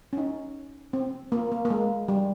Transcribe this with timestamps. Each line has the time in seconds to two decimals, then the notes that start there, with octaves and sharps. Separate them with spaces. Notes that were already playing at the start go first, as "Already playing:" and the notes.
0.13 C#4
0.17 D#4
0.93 C4
1.32 A#3
1.52 A#3
1.65 A#3
1.70 G#3
2.08 G3